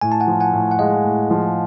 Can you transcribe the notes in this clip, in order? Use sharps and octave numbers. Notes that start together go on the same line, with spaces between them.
A2 G#5
A5
F#5 G#5
F3
F#5 G#5
A2
F#5
G#3 D#5 F5
A2
F3